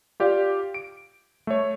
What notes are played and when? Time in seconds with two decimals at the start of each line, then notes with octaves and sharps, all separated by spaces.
0.20 F4 G4 D5 F5
0.74 D7
1.47 A3 C#5